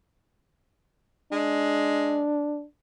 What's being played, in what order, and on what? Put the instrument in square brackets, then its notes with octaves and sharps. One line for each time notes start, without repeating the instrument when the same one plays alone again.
[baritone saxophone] G#3 [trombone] D4